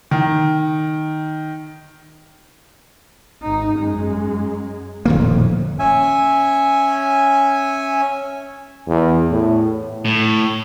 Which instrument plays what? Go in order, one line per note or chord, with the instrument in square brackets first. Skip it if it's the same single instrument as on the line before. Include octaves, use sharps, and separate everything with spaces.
[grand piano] D#3
[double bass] G#1 D#4
F#2 G#3
[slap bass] D1 D#3 A#3 [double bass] F2 A#2
[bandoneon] C#4 E5 G#5
[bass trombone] E2
A2
[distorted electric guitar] A2